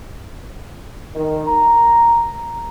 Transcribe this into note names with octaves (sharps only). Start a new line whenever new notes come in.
D#3
A#5